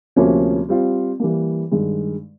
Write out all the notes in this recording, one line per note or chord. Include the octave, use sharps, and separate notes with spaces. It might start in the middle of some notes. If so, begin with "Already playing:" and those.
D2 C3 F3 A#3 C#4
G3 C4 F4
E3 G3 A#3
G2 D#3 G#3